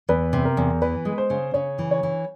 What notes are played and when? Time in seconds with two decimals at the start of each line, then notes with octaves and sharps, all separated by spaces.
0.09 E2 B4
0.33 C3
0.45 A#4
0.57 E2
0.82 E3 B4
1.05 G#3
1.18 C5
1.30 C#3
1.54 C#3 C#5
1.79 E3
1.91 C#5
2.03 E3